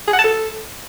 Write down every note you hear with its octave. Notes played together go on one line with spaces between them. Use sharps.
G#4
F#5
A5
A4